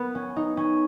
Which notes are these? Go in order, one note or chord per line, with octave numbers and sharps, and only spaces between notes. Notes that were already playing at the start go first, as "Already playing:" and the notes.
Already playing: B3
C#4
D#4
C#4